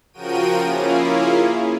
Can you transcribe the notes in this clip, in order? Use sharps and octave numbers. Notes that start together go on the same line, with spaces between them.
C#3 F3 F#4 A#4 G5 D#7
A#3 C#4 E4 F4 G#4